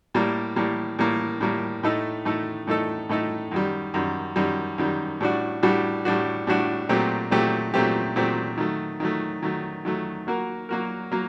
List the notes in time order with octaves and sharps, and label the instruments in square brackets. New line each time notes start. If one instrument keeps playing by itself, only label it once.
[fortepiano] A2 G3 A#3
A2 G3 A#3
A2 G3 A#3
A2 G3 A#3
A2 A3 D#4 A4
A2 A3 D#4 A4
A2 A3 D#4 A4
A2 A3 D#4 A4
F#2 D#3 G3
F#2 D#3 G3
F#2 D#3 G3
F#2 D#3 G3
A2 G3 D4 F#4
A2 G3 D4 F#4
A2 G3 D4 F#4
A2 G3 D4 F#4
A#2 F#3 A3 C4 G4
A#2 F#3 A3 C4 G4
A#2 F#3 A3 C4 G4
A#2 F#3 A3 C4 G4
D#3 F#3 A3
D#3 F#3 A3
D#3 F#3 A3
D#3 F#3 A3
F#3 A#3 F#4 A#4
F#3 A#3 F#4 A#4
F#3 A#3